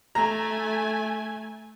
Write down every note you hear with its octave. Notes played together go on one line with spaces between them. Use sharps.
A3 G#5 A#5